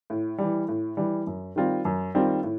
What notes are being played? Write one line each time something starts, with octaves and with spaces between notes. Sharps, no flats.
A2
E3 G3
A2
E3 G3
F#2
D#3 G3 C4 F4
F#2
D#3 G3 C4 F4
A2